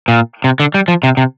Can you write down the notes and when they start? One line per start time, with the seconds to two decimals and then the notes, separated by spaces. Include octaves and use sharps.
0.08 A#2
0.44 C3
0.60 D3
0.74 G3
0.88 F3
1.03 C3
1.17 C3